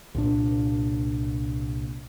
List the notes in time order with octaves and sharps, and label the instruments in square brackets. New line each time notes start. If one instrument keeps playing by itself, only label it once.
[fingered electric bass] C2 A#2 D4